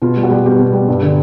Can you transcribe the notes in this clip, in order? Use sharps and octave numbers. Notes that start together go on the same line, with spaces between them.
B2 F4
G3
F#4
G3
B2 G4
B2
G3
G2
D3